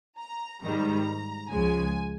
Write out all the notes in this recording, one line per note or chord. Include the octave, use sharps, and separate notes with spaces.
A#5
G#2 D#3 G3 A#5
C#2 C#3 F3 G#3 G#5